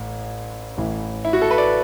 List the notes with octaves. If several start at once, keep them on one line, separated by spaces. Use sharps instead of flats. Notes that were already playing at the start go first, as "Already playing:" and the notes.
Already playing: A1 A2
A1 A2 E3
E4
F#4
A4
B4
D5